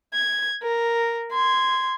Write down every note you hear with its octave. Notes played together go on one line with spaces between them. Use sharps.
G#6
A#4
C6 G#6